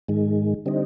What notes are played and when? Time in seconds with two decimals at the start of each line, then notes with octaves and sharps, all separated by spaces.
0.08 G#2 D#3 G#3
0.66 D3 G3 C4 D#4